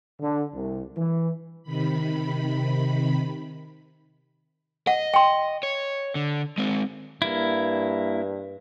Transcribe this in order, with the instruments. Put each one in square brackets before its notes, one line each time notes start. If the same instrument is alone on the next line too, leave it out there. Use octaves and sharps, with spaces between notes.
[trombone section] D3
C2
E3
[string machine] C3 D#3 B5
[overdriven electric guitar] D#5 [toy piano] F#5
[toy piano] G5 C6
[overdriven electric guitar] C#5
D3
G#3 C4
[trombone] G2 [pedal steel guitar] A#3 E4